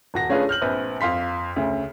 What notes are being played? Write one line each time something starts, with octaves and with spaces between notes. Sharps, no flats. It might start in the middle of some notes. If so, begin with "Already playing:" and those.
D#1 F#4 A#6
A3 C#4 D4 F4 G#4 B4
F6 G6 F#7
A#1 C4 B4
F2 F5 C6 B6
D2 C#3